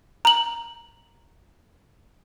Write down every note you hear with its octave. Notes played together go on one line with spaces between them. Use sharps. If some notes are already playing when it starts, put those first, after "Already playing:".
A#5 F#7